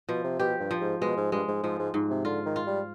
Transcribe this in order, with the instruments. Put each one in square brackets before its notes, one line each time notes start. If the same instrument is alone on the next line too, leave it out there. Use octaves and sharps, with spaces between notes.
[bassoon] B2 [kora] F3
[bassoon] C3
[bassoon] B2 [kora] G4
[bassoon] G2
[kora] F3
[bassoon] G#2
[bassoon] B2 [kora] G#3
[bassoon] G#2
[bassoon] G2 [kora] G#3
[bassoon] G#2
[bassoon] G#2 [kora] F3
[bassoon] G#2
[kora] G#2
[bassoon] C3
[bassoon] D3 [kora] F4
[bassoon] D#3
[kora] F4
[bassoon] G3